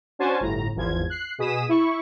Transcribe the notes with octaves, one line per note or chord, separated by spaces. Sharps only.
C#4 D4 F#4 C5 G#5 A5
G1 A2 A#5
G#1 E2 F3 G#6
F#6 C7
B2 G#4 D#6 B6 D#7 E7
E4 C#6